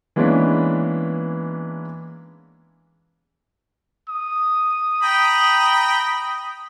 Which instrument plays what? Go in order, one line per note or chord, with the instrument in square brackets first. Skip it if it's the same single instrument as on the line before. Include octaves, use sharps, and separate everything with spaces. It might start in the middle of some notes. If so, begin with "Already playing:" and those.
[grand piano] E3 G#3 A#3 B3 C#4 D4
[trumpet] D#6
[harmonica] G5 A#5 B5